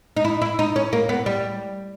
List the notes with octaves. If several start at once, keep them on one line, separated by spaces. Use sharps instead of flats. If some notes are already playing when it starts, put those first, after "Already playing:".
D#4
E4
E4
D#4
C#4
A#3
B3
G3